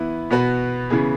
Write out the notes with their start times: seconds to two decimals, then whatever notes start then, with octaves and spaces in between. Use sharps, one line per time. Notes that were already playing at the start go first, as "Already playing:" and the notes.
Already playing: E3 B3 E4 B4
0.30 B2 B3 F#4 B4
0.90 C#3 E3 B3 G#4